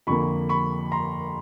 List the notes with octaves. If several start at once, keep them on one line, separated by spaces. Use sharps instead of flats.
F2 D3 F3 A#3 B5 C#6
B5 C#6
A#5 C6